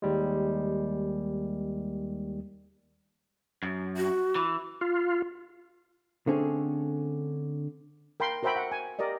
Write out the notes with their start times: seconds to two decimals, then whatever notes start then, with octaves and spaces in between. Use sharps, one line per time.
0.02 D#2 G3 G#3
3.63 F#2
3.97 F#4
4.35 E3
4.81 F4
6.27 D3 A3 C4 C#4 G#4
8.20 A#4 G5 B5 C6
8.43 F#4 A#4 C5 E5 G5 B5
8.56 F#5
8.72 G#5
8.99 G4 A#4 D5 D#5